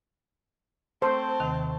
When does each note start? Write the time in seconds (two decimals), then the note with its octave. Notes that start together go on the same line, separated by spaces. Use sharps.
1.02 A3 C4 C5 A5
1.40 D#2 C3 D#3